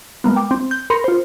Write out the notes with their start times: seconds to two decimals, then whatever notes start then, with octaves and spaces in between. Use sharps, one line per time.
0.24 G#3 A#3 B3
0.36 G5 D6
0.51 C4
0.71 G6
0.90 A#4 B5 C6 C#7
1.04 F4 C5